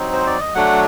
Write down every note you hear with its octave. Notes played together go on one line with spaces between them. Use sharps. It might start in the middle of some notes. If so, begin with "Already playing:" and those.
Already playing: F#3 C4 D#4
C5
D5
D#5
F#3 A3 D4 F#5